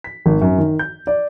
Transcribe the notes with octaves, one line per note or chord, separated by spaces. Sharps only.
B6
G#1
F#2
D#3
G6
D5